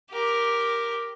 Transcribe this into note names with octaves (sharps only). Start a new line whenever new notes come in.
G4 A#4